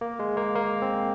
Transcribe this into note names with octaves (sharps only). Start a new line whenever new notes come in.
A#3
G#3
A#3
A#3
C4